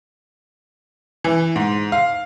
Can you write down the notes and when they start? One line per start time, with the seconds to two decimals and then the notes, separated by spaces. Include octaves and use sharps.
1.24 E3
1.56 G#2
1.92 F5